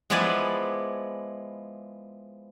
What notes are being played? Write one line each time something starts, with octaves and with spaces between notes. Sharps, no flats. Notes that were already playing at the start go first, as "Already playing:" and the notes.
F3 G#3 B3 E4 D5 G#5